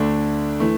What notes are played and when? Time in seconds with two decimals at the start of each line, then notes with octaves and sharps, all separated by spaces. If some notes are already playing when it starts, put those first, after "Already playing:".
Already playing: D2 D3 A3 D4
0.60 E3 A3